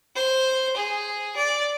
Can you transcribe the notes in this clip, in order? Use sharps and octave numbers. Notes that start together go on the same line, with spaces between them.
C5
G#4
D5